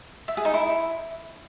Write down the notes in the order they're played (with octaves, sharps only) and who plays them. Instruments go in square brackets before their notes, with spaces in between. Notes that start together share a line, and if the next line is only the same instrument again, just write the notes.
[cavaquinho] E5
G#4
D#4
E4